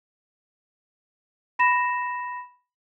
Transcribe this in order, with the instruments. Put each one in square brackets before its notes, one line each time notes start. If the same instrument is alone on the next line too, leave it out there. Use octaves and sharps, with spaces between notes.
[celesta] B5 A#6 E7